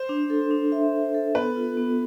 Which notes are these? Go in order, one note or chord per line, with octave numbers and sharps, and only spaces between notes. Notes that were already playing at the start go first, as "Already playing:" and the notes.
Already playing: C5
D4
A4
D4
E5
D4
A4
B3 B4
F4
B3